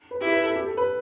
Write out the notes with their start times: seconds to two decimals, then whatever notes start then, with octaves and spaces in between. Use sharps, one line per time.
0.11 B4
0.21 E4 G4
0.32 B4
0.44 A4
0.56 G4
0.66 A4
0.77 B4